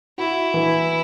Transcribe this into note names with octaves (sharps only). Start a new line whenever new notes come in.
E4 F#4
E3